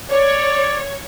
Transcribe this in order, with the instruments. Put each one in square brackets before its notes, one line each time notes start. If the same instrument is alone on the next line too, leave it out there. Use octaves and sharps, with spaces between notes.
[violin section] C#5 [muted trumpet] D5